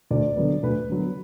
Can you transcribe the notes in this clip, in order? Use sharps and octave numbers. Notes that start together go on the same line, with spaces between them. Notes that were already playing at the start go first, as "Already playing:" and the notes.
D2 D5
D3 F#3 B3
D2 B4
D3 F#3 B3